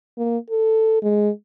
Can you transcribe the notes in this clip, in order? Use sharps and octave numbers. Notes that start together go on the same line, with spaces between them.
A#3
A4
G#3